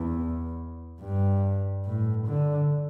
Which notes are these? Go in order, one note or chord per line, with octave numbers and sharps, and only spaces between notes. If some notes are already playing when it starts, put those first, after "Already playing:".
Already playing: E2
G2
A2
D3